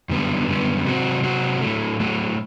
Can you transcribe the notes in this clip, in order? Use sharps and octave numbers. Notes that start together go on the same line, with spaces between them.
F#2 D3 G3 B3
F#2 D3 G3 B3
C3 F#3 C4 F#4
C3 F#3 C4 F#4
A2 F#3 A3
A2 F#3 A3